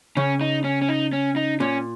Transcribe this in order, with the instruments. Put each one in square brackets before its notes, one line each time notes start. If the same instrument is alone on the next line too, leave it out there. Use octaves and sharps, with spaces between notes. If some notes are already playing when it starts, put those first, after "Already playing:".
[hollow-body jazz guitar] C#3 [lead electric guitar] C#4
[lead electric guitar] D#4
C#4
C#4
D#4
C#4
D#4
[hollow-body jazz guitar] A#2 [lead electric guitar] C#4